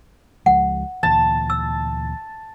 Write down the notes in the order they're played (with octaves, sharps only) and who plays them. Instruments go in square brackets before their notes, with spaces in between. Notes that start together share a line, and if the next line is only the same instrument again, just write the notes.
[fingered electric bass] C#2 F3 G#3 [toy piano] F#5
[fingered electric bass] D2 A#2 E3 [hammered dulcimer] A5
[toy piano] E6